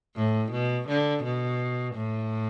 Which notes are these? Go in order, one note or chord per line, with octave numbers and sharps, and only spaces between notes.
A2
B2
D3
B2
A2